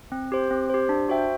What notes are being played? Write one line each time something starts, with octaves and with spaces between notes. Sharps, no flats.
C4
G4 C5
C4
G4 C5
D4
F#4 C5 E5 G5